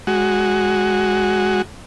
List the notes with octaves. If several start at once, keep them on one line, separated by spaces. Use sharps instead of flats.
G#3 F#4